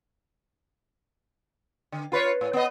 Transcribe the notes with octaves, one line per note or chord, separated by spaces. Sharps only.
D3
F4 B4 C#5
A2
B3 D#5